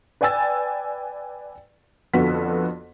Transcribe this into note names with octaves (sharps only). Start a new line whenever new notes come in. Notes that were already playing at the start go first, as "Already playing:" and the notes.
B4 D5 G5 G#5 E6 A6
F2 D3 B3 F#4 A4 B6